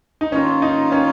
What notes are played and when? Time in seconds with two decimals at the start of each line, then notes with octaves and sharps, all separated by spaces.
0.21 D#4
0.32 D#3 A#3 C#4 F4
0.62 D#4
0.92 C#4